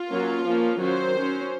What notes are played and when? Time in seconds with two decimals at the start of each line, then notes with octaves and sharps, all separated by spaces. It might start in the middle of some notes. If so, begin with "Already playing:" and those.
Already playing: F4
0.10 F#3 A#3 C#4
0.45 F3 A#3 C#4
0.80 D#3 F#3 C#4 C5
1.15 F#3 C#4